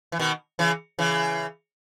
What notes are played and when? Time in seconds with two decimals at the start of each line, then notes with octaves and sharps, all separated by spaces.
0.12 E3
0.19 B2 D#3
0.59 C#3 E3
0.99 C#3 E3